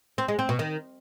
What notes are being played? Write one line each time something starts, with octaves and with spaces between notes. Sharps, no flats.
C4
G#3
C4
B2
D#3